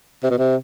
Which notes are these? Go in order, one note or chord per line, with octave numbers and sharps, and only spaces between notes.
C3
B2
C3